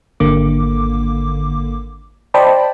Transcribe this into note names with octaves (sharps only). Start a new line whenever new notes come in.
G#1 D3 A#3 D6
C5 D5 D#5 G5 A5 B5